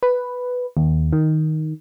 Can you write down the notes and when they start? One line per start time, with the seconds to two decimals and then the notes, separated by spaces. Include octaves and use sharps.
0.03 B4
0.77 D#2
1.13 D#3